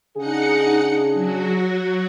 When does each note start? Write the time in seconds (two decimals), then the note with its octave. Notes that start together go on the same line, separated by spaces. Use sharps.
0.17 C#3 D4 D#4 G#4 F#5 C#7
1.13 F#3 F#4